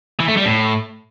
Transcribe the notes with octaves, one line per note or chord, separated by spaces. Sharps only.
E3
A3
G3
A2